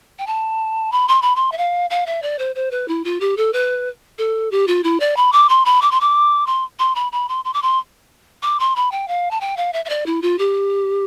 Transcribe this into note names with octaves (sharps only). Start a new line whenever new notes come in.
G5
A5
B5
C6
B5
C6
E5
F5
F5
E5
D5
C5
C5
B4
E4
F4
G4
A4
B4
A4
G4
F4
E4
D5
B5
D6
C6
B5
D6
C6
D6
C6
C6
B5
B5
C6
C6
D6
C6
D6
C6
B5
G5
F5
A5
G5
F5
E5
E5
D5
E4
F4
G4